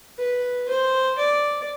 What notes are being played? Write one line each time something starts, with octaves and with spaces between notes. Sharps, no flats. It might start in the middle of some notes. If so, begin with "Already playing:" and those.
B4
C5
D5